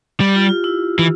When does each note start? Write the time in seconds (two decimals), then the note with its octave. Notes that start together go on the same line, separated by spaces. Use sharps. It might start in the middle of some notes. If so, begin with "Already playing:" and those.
0.20 G3 G4
0.35 F4
0.49 F4
0.64 E4
0.99 E3